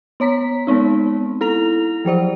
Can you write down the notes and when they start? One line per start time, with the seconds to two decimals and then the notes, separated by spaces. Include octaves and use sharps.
0.20 B3 C#5 A#5 B6
0.67 G#3 B3 C4 D#4
1.41 E4 A4 A#5 F7
2.05 F3 F#3 C5 D5